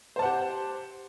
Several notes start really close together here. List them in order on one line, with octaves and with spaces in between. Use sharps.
C5 A5 F#5 G4